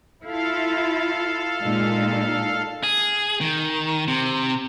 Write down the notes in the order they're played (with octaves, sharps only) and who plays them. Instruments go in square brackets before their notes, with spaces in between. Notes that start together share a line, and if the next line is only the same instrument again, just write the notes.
[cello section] E4 F4 [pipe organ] A4 F5
[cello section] A#2 G#3 D#4
[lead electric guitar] G#4
D#3
C3